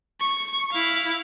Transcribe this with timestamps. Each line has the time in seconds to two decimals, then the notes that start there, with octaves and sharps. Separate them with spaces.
0.20 C#6
0.73 E4 F5